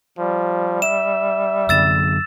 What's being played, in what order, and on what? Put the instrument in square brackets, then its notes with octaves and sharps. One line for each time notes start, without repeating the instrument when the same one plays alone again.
[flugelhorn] F3 [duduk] G3
[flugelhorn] E5 [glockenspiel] E7
[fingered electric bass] F#2 D3 [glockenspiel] E6 A6 E7